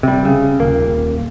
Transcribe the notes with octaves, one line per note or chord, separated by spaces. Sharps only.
C3 G3
C#3
D#1 A#3